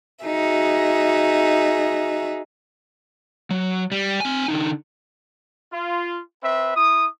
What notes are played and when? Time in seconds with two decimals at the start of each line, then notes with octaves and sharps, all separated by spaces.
0.24 D#4 F#4 G#4 E5
3.51 F#3
3.92 G3
4.20 C4 G#5
4.48 D3 D#4
5.73 F4
6.44 C4 B4 E5
6.76 E4 D#6